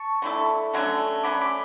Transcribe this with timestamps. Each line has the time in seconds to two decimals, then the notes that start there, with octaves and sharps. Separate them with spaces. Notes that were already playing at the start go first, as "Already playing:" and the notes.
Already playing: A5 C#6
0.22 D3 A3 E4 A4
0.73 D3 F#3 A3 C#4
1.24 D3 F#3 A3 C#4 B5 D6
1.41 B5 D6